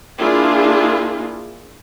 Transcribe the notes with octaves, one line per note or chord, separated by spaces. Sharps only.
A#3 D4 E4 F4 G#4